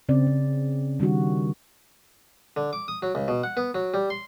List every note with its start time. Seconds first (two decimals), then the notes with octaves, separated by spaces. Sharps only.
0.09 C#3 C4 D5
0.27 C4
0.99 D#3 G3 D4 F#4
2.57 D3
2.73 D6
2.88 D#6
3.02 F#3
3.15 C#2
3.28 B2
3.44 F#5
3.57 B3
3.75 F#3
3.94 G3
4.10 C6